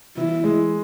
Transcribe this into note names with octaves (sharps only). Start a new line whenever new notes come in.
E3 E4
G#3